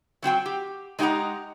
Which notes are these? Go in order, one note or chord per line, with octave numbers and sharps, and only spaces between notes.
F#3 C4 F#4 G5
G4
G#3 D#4 G4 D5 F#5 A#5